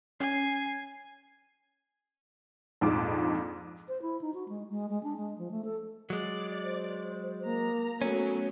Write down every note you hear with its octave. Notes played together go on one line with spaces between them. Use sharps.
C#4 G#5 C7
A#1 F2 G#2 F3 D6
C5
E4
D#4
F#4
G#3
G#3
G#3
D4
G#3
F3
A3
A4
F#3 G#3 D5
C5
A#3 A#5
F#3 A3 B3 C#4